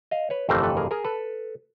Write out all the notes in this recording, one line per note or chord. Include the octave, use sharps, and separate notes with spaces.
D#5 F5
B4 C#5
G1 F2 C3 E3 A3 A#4 C5
A4 B4
G#4 A#4
G#4 A#4
A4 B4